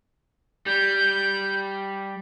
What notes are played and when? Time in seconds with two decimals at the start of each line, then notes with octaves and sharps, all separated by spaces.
0.66 G3 G6